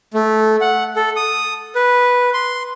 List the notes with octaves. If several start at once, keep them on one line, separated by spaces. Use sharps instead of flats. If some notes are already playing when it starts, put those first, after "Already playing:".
A3
F#5
A4
D#6
B4
C6